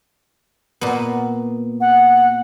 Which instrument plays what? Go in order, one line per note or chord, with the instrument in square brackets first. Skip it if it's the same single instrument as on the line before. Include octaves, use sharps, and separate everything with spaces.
[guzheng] A#2 B3
[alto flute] F#5